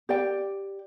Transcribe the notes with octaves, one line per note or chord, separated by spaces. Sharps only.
G4 D5 G5